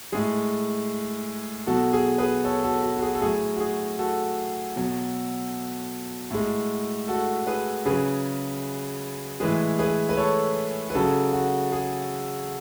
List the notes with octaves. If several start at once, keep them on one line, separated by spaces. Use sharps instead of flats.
A2 G#3 G#4
B2 F#3 F#4 A4
G#4
G#4 B4
A4 C#5
F#4 A4
F#4
F#4
G#4
A4
A2 F#3 G#4
F#4
G#4
F#4 A4
B2 F#3
A2 G#3
F#4 A4
G#4 B4
C#3 F#3 G#4 B4
A2 E3 G#3 G#4 B4
G#4 B4
B4
A4 C#5
B4
C#3 F#3 F#4 A4
F#4
G#4